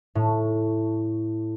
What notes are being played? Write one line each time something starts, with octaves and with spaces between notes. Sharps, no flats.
A2